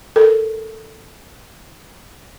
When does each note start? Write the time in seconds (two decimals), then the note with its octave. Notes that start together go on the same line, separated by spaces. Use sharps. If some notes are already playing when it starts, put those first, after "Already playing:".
0.16 A4 A#4